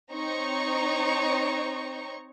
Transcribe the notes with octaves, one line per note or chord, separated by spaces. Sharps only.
C4 D#4 C#5 A#5 C#6